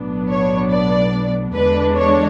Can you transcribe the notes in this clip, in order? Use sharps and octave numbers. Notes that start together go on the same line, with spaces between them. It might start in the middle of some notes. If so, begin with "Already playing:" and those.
Already playing: B1 A2 F#3 B3 D4
C#5
D5
E2 D3 G#3 D4 B4
C#5